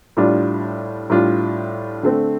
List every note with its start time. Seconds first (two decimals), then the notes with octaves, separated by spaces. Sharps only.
0.17 A2 G3 D4 F4
1.10 A2 G3 D4 F4
2.03 D3 A3 C4